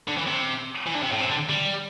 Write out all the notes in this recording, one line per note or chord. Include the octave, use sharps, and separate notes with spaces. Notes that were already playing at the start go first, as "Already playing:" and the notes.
D3
E3
C3
E3
D3
C3
A2
C3
D3
G3